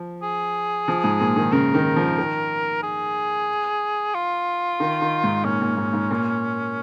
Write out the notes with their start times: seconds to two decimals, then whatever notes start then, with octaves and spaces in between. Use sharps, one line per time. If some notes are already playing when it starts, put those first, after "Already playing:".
Already playing: F3
0.22 G#4
0.88 F3
1.04 G#2
1.20 A#2
1.36 D#3
1.52 C#3 A#4
1.74 D#3
1.96 F3
2.18 D#3
2.83 G#4
4.14 F4
4.80 D#3
5.01 D#3
5.24 G#2
5.44 A#2 C#4
5.61 A#2
5.77 G#2
5.93 G#2
6.11 A#2